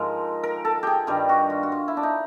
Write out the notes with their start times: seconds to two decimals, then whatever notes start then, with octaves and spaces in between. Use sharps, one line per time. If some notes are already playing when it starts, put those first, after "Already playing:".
Already playing: G#2 F3 G#3 A#4
0.43 A#4
0.65 A4
0.83 G4 G#4
1.07 G2 D#3 G3 G4
1.29 F#4
1.50 F4
1.63 F#4
1.72 F4
1.88 E4
1.97 D4
2.03 D#4